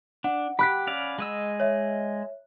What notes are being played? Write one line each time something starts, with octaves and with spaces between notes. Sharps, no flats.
D4 F#5
G4 B5 F#6 B6
C#4 D5 F5
G#3 D#5 E6
C#5 E5